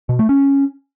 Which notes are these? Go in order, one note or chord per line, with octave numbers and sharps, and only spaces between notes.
B2
A3
C#4